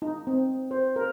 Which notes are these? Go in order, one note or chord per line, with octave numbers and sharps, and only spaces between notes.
D#4
C4
C5
A#4